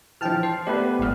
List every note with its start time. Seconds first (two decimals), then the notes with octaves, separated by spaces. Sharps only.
0.21 E3 F3 G5 A5 F6
0.43 C5 C7
0.67 A3 B3 G4 B4 D5
0.99 G1 G#2 B5 F6